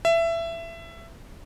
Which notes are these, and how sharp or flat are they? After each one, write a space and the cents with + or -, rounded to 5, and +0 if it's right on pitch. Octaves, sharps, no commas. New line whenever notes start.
E5 +20